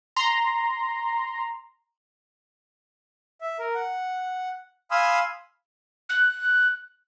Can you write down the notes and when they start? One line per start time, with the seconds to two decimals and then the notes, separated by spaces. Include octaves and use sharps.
0.16 A#5 C6
3.41 E5
3.59 A#4
3.75 F#5
4.91 F5 G#5 B5 C6 D#6 E6
6.09 F#6